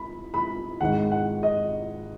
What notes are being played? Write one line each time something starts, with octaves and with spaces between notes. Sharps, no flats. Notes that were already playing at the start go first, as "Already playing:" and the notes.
Already playing: B5
B5
G#1 G#2 D#3 F#5
F#5
D#5